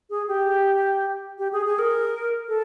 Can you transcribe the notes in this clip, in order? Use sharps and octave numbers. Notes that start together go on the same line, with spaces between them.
G#4
G4
G4
G#4
G#4
A#4
A4